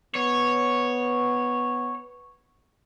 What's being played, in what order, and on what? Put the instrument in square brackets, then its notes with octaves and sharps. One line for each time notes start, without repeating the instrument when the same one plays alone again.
[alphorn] B3 [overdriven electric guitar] C#5